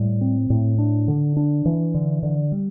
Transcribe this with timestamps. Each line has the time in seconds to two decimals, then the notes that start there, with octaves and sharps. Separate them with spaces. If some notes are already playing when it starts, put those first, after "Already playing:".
Already playing: A2 G3
0.21 C4
0.50 A2
0.78 D4
1.08 D3
1.37 D4
1.65 E3
1.94 D3
2.23 D3
2.52 G3